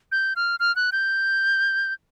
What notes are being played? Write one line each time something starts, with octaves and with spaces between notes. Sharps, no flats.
G6
F6
F6
F#6
G6